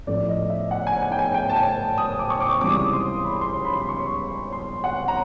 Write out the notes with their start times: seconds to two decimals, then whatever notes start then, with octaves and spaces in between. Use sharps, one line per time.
0.07 A1 A2 F3 A3 D5
0.28 D#5
0.50 E5
0.71 F#5
0.87 G#5
1.03 G#5
1.12 G5
1.19 G#5
1.34 G5
1.50 A5
1.56 G#5
1.98 D#6
2.19 D6
2.30 C#6
2.40 D6
2.61 C#2 C3 E3 G3 D6
2.69 D#6
2.76 D6
2.93 C6
3.24 B5
3.41 C6
3.65 B5
3.73 C6
3.89 C#6
4.52 C6
4.84 F#5
5.08 A#5